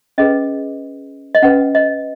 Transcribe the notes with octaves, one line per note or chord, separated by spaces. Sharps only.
C#4 G#4 B4 D#5
D#5
C#4 B4 F#5
D#5